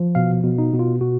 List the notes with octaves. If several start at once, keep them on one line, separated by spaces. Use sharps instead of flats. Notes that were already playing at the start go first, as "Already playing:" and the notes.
Already playing: F3
B2 F5
B2
D#4
B2
F4
B2 F#4